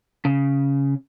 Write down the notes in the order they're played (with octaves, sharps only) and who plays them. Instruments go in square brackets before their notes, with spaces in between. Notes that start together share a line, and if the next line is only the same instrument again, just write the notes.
[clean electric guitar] C#3